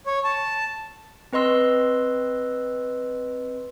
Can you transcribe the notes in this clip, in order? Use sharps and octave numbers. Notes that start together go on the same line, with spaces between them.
C#5
A5
C4 B4 D#5 C6 E6